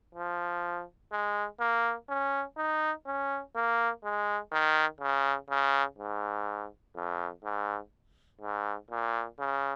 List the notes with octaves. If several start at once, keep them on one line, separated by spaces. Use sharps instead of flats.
F3
G#3
A#3
C#4
D#4
C#4
A#3
G#3
D#3
C#3
C#3
G#2
F2
G#2
G#2
A#2
C#3